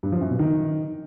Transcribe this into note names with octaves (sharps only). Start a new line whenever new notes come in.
G2
F3
F#2
B2
D#3